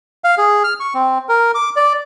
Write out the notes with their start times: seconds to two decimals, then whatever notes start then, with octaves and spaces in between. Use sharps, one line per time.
0.24 F5
0.38 G#4
0.64 F6
0.80 C#6
0.94 C4
1.29 A#4
1.55 D6
1.76 D5